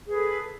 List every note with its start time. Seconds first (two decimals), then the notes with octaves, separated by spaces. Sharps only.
0.06 G#4
0.10 B4
0.13 A4